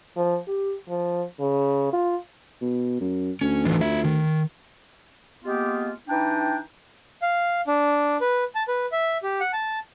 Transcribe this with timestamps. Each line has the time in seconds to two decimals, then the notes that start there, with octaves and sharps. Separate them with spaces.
0.17 F3
0.47 G4
0.89 F3
1.40 C#3
1.93 F4
2.61 B2
3.00 F#2
3.41 D2 C#4
3.65 A2 D#3 E3
3.81 F4 E5
4.05 D#3
5.45 G#3 A#3 B3 F4 G4
6.07 E3 D4 D#4 G5
7.22 F5
7.67 D4
8.21 B4
8.55 A5
8.68 B4
8.92 E5
9.23 G4
9.40 F#5
9.53 A5